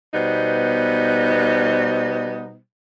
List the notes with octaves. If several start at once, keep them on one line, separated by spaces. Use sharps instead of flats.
B2 G3 B3 D#4 C5